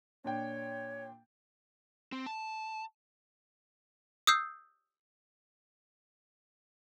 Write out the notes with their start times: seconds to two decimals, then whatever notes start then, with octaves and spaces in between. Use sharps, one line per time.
0.24 A#2 D4 C#5 G5
2.12 C4
2.26 A5
4.27 D#6 E6 G6 C7